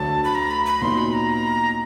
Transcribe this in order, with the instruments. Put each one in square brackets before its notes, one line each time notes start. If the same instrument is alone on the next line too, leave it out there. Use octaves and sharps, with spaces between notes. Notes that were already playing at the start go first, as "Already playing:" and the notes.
Already playing: [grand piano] D2 D3 F#3 A3 D4 [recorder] A5
[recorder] B5
A#5
B5
B5
[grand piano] A#2 F#3 B3 D#4 [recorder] C6
[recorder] B5
A#5